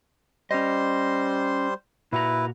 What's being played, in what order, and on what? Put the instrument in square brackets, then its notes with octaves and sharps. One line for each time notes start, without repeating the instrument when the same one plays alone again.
[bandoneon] G3 C5 C6 [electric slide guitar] C#4 D#5
[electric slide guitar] A#2 F#4 A#5 [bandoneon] E4 B4